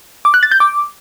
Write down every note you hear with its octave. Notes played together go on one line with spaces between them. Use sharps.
D6
F#6
A6
G6
D6